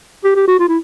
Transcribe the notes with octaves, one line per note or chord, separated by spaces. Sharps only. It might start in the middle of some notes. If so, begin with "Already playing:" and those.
G4
G4
F#4
F4
E4